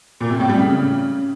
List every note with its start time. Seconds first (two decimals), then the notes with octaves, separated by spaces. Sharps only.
0.21 A#2
0.30 C3
0.40 A2
0.49 G3
0.59 C#3